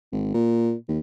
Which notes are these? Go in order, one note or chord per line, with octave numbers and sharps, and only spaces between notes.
G#1
A#2
D#2